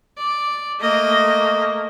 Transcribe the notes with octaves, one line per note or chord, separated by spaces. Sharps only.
D5
A3 A#3 D#5